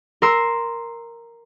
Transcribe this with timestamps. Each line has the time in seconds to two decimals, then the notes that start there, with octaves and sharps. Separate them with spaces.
0.22 A#4 C6 E6